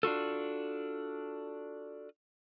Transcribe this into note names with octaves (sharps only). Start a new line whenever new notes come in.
D4 F4 F#4 A4